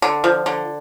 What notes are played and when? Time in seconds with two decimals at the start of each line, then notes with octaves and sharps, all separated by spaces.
0.02 D3
0.24 F3
0.46 D3